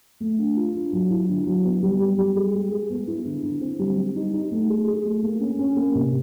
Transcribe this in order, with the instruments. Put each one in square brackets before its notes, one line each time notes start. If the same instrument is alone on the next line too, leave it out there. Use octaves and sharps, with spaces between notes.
[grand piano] A3
D4
F4
D4
F#3
E4
D3
F#3
B3
G3
G3
G3
G#4
G#3
G#4
B3
E4
D3
D3
C4
G3
G3
D#4
D#4
A3
G#4
G#4
A3
A#3
C#4
C#4
A#3
C3